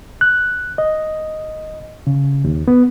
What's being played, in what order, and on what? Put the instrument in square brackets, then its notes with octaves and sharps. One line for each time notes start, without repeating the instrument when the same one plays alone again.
[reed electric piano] F#6
D#5
C#3
D#2
B3